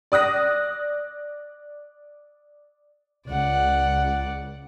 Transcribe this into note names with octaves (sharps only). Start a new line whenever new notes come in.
D5 D#6 F#6 A#6
C#2 D5 F#5